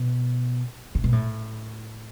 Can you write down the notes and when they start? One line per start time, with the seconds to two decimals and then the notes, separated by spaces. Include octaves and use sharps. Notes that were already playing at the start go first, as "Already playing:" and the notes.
Already playing: B2
0.95 C3
1.04 B2
1.12 A2